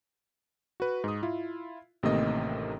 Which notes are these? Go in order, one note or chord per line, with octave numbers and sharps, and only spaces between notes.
F#4 B4
G#2 D#6
E4 F4
A1 C3 D#3 A3 A#3 D#5